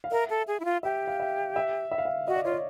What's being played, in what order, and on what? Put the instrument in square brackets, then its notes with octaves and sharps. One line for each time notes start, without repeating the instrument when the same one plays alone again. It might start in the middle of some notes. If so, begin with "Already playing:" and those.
[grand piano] F5
[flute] A#4 [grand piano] E5
[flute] A4
G#4
E4
F4
[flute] G4 [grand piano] E5
[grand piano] F5
E5
E5
E5
F5
E5
[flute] F#4 [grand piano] D#5
[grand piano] D5
[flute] F4 [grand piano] C#5
[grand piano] D5